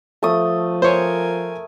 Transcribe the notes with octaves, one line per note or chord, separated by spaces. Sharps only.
F3 A3 D#6
A#4 C5 C#5 G#5